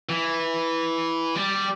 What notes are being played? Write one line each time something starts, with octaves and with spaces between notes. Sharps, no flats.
E3
G3